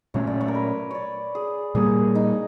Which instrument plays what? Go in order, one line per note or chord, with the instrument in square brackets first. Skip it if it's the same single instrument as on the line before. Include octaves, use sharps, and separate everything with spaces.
[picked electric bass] A#2 F#3 A3 C#4 [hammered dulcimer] C#5
[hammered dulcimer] D5
C#5
A#4
B4
C#5 D5
G#4
[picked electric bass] A#2 G3 A#3 [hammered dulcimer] G#4
[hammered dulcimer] D#4